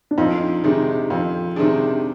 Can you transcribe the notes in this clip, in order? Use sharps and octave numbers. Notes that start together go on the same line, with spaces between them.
D4
F2 D#4
C3 D#3 G#3 D4
F2
C3 D#3 G#3 D4